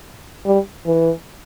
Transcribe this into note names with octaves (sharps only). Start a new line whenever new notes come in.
G3
E3